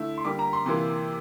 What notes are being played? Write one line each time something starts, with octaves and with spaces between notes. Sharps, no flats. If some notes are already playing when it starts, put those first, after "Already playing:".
Already playing: D3 A3 E4
C6
D3 G3 A#3 D6
A#5
C6
C3 E3 A#3 C6